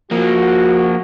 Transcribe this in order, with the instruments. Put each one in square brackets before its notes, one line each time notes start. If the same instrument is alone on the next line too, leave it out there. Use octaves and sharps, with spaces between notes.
[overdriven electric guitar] F3 A#3 [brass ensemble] F#4